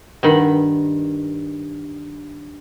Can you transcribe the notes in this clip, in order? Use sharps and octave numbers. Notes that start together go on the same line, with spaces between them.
G2 D#3 F#5 B5